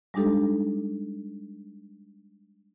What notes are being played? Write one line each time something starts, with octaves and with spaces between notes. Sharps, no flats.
G3 G#3 D4 D#4 G4 A4